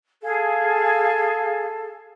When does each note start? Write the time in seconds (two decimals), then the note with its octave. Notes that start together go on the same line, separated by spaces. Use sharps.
0.23 G#4 A4 F5